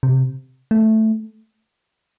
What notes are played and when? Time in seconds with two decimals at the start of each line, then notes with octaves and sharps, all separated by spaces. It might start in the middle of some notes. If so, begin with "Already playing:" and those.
0.03 C3
0.71 A3